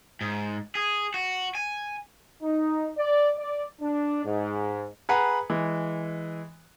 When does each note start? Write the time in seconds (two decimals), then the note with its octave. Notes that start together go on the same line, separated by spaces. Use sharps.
0.21 G#2
0.75 G#4
1.14 F#4
1.55 G#5
2.43 D#4
2.97 D5
3.37 D5
3.81 D4
4.25 G#2
5.09 G#4 B4 F#5 A#5
5.50 E3 G#3